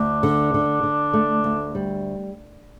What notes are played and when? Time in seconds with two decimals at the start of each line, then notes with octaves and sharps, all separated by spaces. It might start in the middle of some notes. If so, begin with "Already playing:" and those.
Already playing: D2 D4
0.23 D3
0.54 D3
0.83 D3
1.13 A3
1.44 D2
1.75 G3